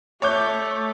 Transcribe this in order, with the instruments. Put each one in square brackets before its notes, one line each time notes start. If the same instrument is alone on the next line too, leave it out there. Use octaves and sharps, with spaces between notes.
[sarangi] A3 [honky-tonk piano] C#5 D6 G6